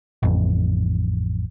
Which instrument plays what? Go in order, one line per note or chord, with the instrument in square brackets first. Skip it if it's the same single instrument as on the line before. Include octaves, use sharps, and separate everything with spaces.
[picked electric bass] A1 F2